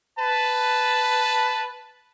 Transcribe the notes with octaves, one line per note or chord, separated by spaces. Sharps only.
B4 A5